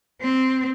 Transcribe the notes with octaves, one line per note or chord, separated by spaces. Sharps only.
C4